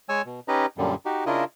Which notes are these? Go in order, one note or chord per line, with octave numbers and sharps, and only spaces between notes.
G#3 C#5 G#5 E6
B2
C#4 D#4 G4 B4 D#5 A#5
F#2 A#2 D3 G3
D#4 F#4 G4
C#3 D4 E4 F4 A#4 D#5